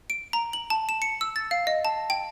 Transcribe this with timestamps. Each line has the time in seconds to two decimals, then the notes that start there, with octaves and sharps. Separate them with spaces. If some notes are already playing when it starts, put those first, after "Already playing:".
0.10 D7
0.33 A#5
0.53 F#7
0.70 A5
0.89 E7
1.02 C#7
1.21 E6
1.36 A6
1.51 F5
1.67 D#5
1.85 A5
2.10 G5